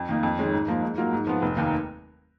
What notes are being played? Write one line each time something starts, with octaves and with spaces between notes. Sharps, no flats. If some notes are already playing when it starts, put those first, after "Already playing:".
Already playing: F2
D#3 A#3 D#4
F2
D#3 G#3 C#4
G#2
F3 A#3 D#4
G#2
F#3 A#3 F4 A#4
G#2
F3 B3
F1
D#2 D#3 A#3